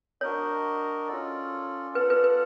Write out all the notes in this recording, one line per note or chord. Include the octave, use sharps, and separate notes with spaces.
D4 F#4 A#4 C#5 D#5
C#4 F4 A4 D5
F4 A4 B4 D5 F#5
B4
B4